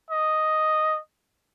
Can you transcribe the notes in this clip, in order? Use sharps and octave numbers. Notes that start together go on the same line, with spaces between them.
D#5